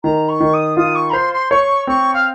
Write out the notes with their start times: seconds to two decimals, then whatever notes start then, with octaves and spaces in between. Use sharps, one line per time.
0.03 D#3 A#5
0.28 C#6
0.40 D#3
0.53 D#6
0.77 F4 D#6
0.95 C#6
1.10 A#5
1.13 C5 C6
1.33 C6
1.51 C#5 C#6
1.87 C4 C#6
2.13 F5